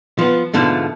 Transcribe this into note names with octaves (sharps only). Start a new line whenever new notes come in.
F3 B3
G#2 B2 D3 F3 A3